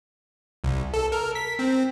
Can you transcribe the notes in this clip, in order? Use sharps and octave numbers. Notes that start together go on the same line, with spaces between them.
C2
A4
A#4
B6
C4